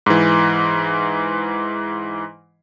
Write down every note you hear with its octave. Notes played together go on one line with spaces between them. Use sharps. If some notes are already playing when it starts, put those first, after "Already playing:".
G#2 E3